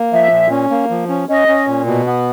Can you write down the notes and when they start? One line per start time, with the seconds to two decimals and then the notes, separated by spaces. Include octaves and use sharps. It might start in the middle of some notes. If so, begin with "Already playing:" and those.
Already playing: A#3
0.13 F3 E5
0.32 A#2
0.51 C#4
0.70 A#3
0.90 F3
1.09 C#4
1.29 C#4 D#5
1.48 C#4
1.67 A#2
1.86 B2
2.07 B3